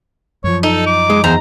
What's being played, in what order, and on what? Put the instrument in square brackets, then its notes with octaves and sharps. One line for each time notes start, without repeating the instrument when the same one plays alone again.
[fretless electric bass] F#2 F3 [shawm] C#5
[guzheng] D#4 [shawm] A4
[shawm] D6
[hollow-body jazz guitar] G#3
[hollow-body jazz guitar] E2 [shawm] C5 [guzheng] A#5